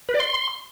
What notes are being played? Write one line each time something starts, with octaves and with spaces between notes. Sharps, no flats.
B4
D5
C6